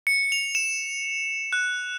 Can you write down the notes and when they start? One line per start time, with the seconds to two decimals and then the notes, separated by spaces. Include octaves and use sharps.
0.07 C#7
0.32 F7
0.55 E7
1.53 F#6